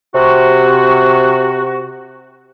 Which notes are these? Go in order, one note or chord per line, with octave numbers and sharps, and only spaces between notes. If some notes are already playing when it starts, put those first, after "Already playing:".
C3 F#4